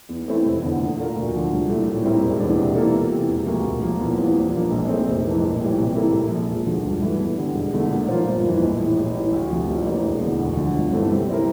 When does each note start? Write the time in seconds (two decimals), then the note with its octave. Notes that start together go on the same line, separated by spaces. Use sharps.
0.09 E2
0.26 E3 A3 C4 E4
0.44 F1
0.62 E2 D3
0.80 A#2
0.97 A3 D4 F4 A#4
1.15 D2
1.34 D3 F3
1.51 C2
1.69 A#2 A3 E4
1.87 A2
2.05 G3 C4 E4 A#4
2.22 E1
2.40 E2 E3 A#3 D4
2.58 C3
2.76 E3 A#3 F4 A4
2.93 E2
3.12 C3 E3
3.29 E1
3.46 D2 C3 F3 A#3
3.65 A#1
3.82 A#2 F3 A#3
4.00 E2
4.18 E3 G3 C4 F4
4.35 A#2
4.53 F3 A#3 D4
4.71 A#1
4.88 A#2 A3 C4
5.07 F1
5.25 F2 E3 A#3
5.42 A#1
5.60 A2 E3 G3
5.78 C3
5.95 E3 A#3 E4 A4
6.13 A#1
6.31 A#2 F3
6.48 E1
6.66 D2 D3 F3
6.85 G2
7.01 E3 A3 E4
7.19 E2
7.37 D3 G3
7.54 E1
7.73 E2 D3 A3
7.91 A#2
8.08 F3 A#3 F4 C5
8.26 G1
8.44 F2 E3
8.62 A#1
8.79 A2 E3
8.97 A1
9.15 A2 E3
9.32 D2
9.50 C3 F3
9.69 A1
9.86 A2 E3 A#3 D4
10.04 E1
10.21 E2
10.26 D3
10.39 D2
10.56 D3 F3
10.75 G1
10.92 G2 E3 A3 C4
11.11 C3
11.28 G3 C4 E4 A#4